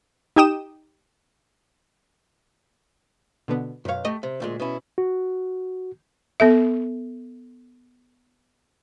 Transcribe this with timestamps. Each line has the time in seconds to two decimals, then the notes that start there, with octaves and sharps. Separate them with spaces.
0.36 D#4 G4 G5 D#6 E7
3.48 B2 D3 B3
3.85 B1 F#2 C#5 F5
4.05 A3 G4 D#5
4.23 C3
4.40 D2 A#2 G#3
4.60 B2 C#4 E4
4.98 F#4
6.40 B3 A4 E5